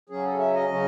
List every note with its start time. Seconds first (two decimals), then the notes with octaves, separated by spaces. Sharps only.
0.09 C#3 F#3 C#4 G#4
0.24 A4
0.39 E5
0.54 D#5
0.68 C#3 F#3 C#4